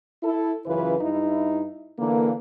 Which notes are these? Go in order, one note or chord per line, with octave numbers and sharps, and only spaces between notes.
E4 A4
F#2 C#3 E3 F4 B4
G2 D#4 E4
D3 E3 A#3